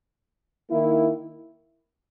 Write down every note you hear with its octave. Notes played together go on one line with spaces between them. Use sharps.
D#3 A#3 E4